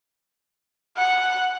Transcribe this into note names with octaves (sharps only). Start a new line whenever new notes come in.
F#5